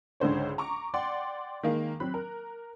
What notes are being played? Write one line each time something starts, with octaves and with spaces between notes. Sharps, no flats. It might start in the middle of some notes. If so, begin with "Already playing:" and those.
C#2 G#2 D3 C5 C#5
A#5 C#6 D6
D5 F#5 G5 C6
D#3 G#3 A#3
F#3 C4 B5 F#6
A#4